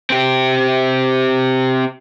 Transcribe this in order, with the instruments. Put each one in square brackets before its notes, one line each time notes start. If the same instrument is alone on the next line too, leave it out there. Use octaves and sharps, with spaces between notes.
[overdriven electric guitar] C4 G4